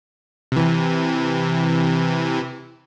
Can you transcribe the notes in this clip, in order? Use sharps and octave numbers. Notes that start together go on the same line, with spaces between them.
C3 E3